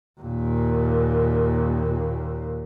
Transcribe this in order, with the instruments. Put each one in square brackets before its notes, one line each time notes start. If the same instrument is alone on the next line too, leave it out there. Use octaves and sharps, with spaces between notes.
[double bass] D#2 A#2